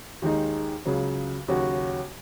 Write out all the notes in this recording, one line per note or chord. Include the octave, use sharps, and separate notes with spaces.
D#2 D#3 G#3 D#4
C#2 C#3 F#3
D#2 C#3 F#3 C#4 F#4